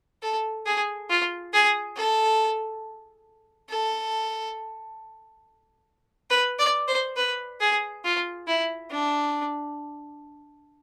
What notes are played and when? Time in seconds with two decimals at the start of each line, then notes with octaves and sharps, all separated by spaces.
0.22 A4
0.66 G#4
1.09 F4
1.53 G#4
1.96 A4
3.70 A4
6.30 B4
6.59 D5
6.87 C5
7.16 B4
7.60 G#4
8.04 F4
8.47 E4
8.90 D4